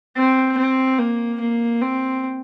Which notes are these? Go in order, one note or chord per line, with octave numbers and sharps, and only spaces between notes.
C4
C4
A#3
A#3
C4